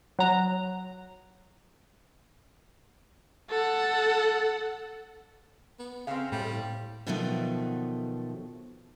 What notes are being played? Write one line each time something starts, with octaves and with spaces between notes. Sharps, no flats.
F#3 A#5
A4 F#5
B3
C#3 C4 F5
A2 G3
B2 D#3 F3 F#3 A3